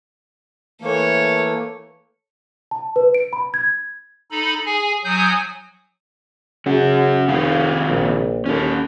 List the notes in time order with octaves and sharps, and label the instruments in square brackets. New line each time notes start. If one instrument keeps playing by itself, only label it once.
[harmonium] E3 A3 A#3 [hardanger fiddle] A4 C#5
[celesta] A5
B4
D7
B5
G#6
[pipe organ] D#4 A4 B5
G#4 G#5
F#3 G#5 D#6 G6
[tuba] C#3 [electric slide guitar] C#4 F#4
[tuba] F1 [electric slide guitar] C3 D#3 F5
[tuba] A#1
[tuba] D#2 [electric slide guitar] C#4 A4